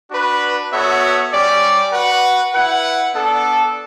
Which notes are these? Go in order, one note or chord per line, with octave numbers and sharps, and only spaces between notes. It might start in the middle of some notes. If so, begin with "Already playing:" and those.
D4 F#4 B4
B3 F#4 A4 C#5 E5
G3 C#4 G4 D5
F#4 B4 F#5
E4 B4 F#5
B3 D4 A4